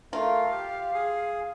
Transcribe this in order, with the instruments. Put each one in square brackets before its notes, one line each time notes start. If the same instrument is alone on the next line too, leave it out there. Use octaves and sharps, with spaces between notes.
[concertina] A3 A#4 [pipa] F4 [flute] F5
[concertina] G4
G#4